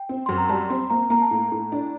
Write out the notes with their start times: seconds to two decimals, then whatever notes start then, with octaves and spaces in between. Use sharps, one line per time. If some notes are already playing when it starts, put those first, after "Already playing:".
Already playing: G5
0.09 C4
0.26 F#2 C6
0.38 A#5
0.49 G3 A5
0.69 C4 C6
0.90 A#3 A#5
1.10 A#3 A#5
1.22 A5
1.31 A2 A#5
1.52 A2
1.72 D4